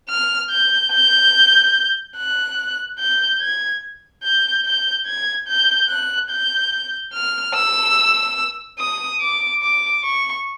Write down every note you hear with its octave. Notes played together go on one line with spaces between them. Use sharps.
F6
G6
G6
F#6
G6
G#6
G6
G6
G#6
G6
F#6
G6
F6
E6
D#6
D6
D6
C#6